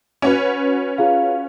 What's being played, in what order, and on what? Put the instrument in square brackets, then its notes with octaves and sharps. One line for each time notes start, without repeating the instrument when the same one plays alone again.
[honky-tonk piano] C#4 F#4 B4
[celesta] F4 G#4 F5